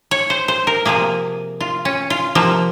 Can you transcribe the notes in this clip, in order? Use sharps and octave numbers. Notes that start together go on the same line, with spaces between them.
C#5
C5
C5
A#4
C3 F3 A#3 G#4
F4
C#4
F4
C3 F3 A#3